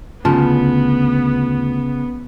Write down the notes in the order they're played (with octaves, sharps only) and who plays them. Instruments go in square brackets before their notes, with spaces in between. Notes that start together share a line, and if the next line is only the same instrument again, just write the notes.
[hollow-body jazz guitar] D2 F4 A5 [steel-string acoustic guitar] C#3 [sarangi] B3